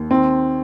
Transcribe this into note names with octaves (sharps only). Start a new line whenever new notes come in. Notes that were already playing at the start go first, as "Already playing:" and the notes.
Already playing: D#2
D#3 C4